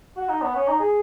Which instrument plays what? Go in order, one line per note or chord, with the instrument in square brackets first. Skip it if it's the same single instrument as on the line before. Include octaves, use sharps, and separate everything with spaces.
[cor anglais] F#4
D#4
B3
C#4
D#4
G#4